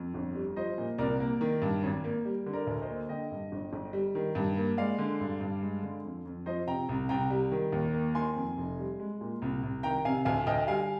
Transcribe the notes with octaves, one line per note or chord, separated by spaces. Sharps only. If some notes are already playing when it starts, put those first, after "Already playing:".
Already playing: F2
G1
G3
F3 C5 D#5
A#2
C2 A#4 D5
A#3
D#3
G2
G#1
A#3
G3
D3
A#4 D5
D2
C5 D#5
A#3
D3 D#5 G5
G2
G1
G1
G3
D#3
G2
A#3
G#3 D5 F5
D3
G2
G2
G#3
D3
F2
F2
F3 C5 D#5
C3 G5 A#5
C2
C2 G5 A#5
G3
D#3
D#2
A#3
D#3 G#5 C6
F2
F1
G3
G#3
A#2
C2
C2
D#3 G5 A#5
C3 F5 G#5
D2 F5 G#5
D2 D#5 G5
G3 F5 G#5